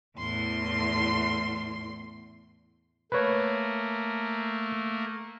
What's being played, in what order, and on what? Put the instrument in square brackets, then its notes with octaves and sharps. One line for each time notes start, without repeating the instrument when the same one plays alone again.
[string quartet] E2 A2 C6
[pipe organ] A3 A#3 [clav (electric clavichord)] B4 C#5